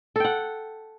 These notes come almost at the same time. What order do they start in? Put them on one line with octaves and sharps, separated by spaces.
A4 G5 F#5